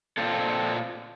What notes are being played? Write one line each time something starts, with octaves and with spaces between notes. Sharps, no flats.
A#2 C4 F4 A4